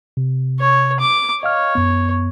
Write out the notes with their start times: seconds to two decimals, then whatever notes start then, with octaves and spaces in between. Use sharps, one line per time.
0.17 C3
0.60 C#5
1.00 D6
1.43 C#5 D#5 F5 F6
1.75 F#2 B3